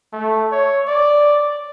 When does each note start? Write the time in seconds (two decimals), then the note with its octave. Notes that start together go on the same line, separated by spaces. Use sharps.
0.13 A3
0.52 C#5
0.88 D5